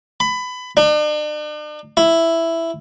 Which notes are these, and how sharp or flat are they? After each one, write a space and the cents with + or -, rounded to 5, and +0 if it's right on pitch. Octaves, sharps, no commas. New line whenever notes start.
B5 +20
D4 +45
E4 +5